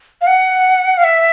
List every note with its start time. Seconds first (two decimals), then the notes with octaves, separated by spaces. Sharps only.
0.21 F5
0.27 F#5
0.98 F5
1.04 E5